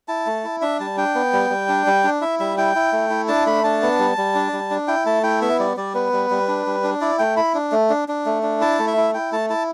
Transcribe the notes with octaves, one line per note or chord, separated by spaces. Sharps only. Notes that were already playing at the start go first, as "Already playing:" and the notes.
E4 A5
A3
E4
D4 E5
G3 A5
D4 G5
B3
G3
G3
D4
G3
D4
E4 E5
G3 E5
E4 G5
E4
A3
E4
D4 A5
A3 B5
D4 A5
B3
G3
G3
D4
G3
D4
E4 G5
A3 A5
E4 G5
B3 E5
G3 D5
G3 D5
B3 B4
G3
G3
D4
G3
D4
E4 D5
A3 G5
E4 B5
D4
A3
D4
D4
A3
D4
E4 A5
A3
E5
E4
E4 G5
A3 A5
E4 A5